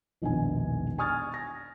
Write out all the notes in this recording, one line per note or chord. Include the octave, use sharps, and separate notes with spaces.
E1 A#1 D#3 B3 G#5
G#5 C#6 D#6 F6 G#6 A6
A#6